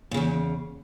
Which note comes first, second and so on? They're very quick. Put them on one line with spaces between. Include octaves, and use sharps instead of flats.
A#2 C#3 E2